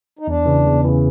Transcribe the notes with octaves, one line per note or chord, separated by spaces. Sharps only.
D#4
E2 D4
C#3 E3
E2
C#3 E3